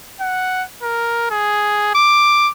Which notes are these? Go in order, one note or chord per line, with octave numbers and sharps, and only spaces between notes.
F#5
A#4
G#4
D6